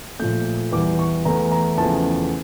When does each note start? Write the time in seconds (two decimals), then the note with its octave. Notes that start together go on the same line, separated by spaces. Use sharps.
0.19 A#2 F3 A3 G6
0.72 E2 E3 G3 D6
0.99 C#6
1.25 E2 E3 A3 A#5
1.52 A#5
1.78 E2 C#3 F3 A3 A5